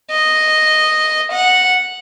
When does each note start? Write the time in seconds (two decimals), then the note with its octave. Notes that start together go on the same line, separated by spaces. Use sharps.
0.11 D#5
1.32 F#5